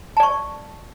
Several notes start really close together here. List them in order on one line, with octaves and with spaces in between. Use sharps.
A5 D5 C#6